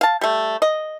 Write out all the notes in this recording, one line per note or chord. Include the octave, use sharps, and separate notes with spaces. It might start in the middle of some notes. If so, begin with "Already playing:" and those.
F5 A5
G3 A3
D#5